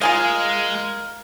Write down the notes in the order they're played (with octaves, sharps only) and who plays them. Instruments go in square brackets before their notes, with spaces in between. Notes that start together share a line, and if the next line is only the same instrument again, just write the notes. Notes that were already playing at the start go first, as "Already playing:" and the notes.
[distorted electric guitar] G#3 [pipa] F4 G#4 F5 [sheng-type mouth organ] A#4